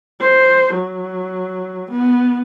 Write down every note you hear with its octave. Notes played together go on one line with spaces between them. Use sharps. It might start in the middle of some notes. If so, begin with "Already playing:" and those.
C5
F#3
B3